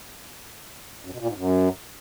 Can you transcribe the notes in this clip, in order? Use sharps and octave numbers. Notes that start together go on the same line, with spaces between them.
F#2
B2
A#2
G#2
F#2